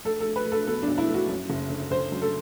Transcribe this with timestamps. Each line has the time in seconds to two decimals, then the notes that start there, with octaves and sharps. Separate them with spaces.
0.05 A3 A4
0.20 A4
0.26 A3
0.36 B4
0.46 A3
0.52 A4
0.67 B2 A4
0.82 D4
0.88 B1
0.98 E4
1.08 A3
1.14 F#4
1.28 F#2
1.50 F#1
1.70 D3
1.91 D3 C5
2.12 F#2
2.22 A4